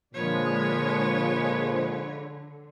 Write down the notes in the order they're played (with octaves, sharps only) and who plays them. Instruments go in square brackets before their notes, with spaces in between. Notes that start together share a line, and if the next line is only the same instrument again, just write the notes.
[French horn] A#2 [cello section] D3 [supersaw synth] F3 G#3 [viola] B4 C#5